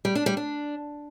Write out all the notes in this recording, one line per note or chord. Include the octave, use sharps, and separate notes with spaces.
G3
D4
G3
D4